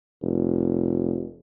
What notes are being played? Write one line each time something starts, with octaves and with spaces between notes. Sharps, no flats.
F1